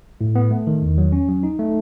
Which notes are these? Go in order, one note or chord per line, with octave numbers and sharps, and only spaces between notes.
A2
B3
A3
D#3
E2
F#3
C#4
F#3
D#4
A3